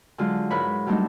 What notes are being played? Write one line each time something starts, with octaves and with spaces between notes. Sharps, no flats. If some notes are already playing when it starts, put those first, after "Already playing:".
D3 F#3 G#3 F4
G#2 E4 A#4 B4 C#5 B5
F#3 G3 A3 C4 D4 D#4